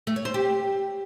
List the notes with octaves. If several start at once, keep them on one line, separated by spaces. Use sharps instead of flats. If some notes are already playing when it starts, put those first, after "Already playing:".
A3
C#5
C5
G4